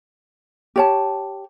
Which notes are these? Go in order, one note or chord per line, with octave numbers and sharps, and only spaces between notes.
G4 C#5 A5